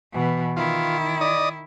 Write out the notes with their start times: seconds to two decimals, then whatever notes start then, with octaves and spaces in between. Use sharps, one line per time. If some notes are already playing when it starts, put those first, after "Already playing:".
0.12 B2 E3
0.56 D#3 E4 F4
1.21 D5 D#5 D#6